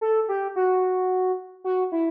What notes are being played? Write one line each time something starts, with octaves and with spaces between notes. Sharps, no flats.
A4
G4
F#4
F#4
E4